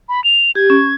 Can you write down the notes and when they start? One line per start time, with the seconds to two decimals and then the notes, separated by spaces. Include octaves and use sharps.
0.09 B5
0.24 F7
0.55 G4 G#6
0.70 C#4